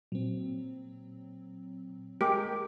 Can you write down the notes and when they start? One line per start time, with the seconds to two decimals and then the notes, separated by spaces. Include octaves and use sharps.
0.12 A#2 F#3 C4
2.21 G#3 G4 A#4 D6